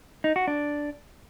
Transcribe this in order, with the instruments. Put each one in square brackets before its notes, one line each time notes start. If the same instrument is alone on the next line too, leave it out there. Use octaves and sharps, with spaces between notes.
[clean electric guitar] D#4
F#4
D4